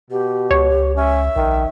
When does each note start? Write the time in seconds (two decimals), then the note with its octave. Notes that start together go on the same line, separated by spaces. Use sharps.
0.11 B2 G4
0.51 C#2 C#5
0.96 C#4 E5
1.36 A#1 D#3